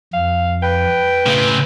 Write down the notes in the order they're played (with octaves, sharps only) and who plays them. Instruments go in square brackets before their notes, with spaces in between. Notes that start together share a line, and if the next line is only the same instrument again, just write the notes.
[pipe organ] F2 [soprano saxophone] F5
[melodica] B4 [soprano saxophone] G5
[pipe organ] A2 [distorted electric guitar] C#3 C4